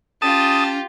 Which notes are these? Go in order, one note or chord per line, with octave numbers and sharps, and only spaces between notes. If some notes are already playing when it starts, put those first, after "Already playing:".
C#4 F4 G4 A5 D#6